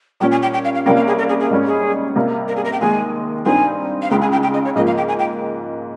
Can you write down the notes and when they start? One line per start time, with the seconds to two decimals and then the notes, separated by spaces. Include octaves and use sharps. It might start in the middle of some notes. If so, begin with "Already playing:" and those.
0.20 A#2 G3 C#4 G5
0.31 G#5
0.42 G5
0.53 G5
0.65 F5
0.75 F5
0.86 C2 C3 G3 A#3 C#4 G5
0.96 F5
1.07 G#4
1.18 A#4
1.29 G#4
1.40 G#4
1.51 G#2 G3 C#4
1.67 G#4
2.15 C3 G3 A#3
2.48 A#4
2.56 G#4
2.65 A#4
2.73 G5
2.80 D#2 D#3 G#3 G#5
3.45 G2 G3 C4 D#4 G#5
4.02 F5
4.11 C#2 C#3 G#3 G5
4.21 G#5
4.32 G5
4.43 G5
4.54 D#5
4.65 C#5
4.75 G#2 F3 A#3 D#5
4.87 F5
4.97 G5
5.08 G#5
5.19 G5